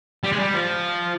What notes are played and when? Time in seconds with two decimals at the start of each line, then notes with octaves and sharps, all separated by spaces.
0.24 G3
0.32 G#3
0.39 G3
0.53 F3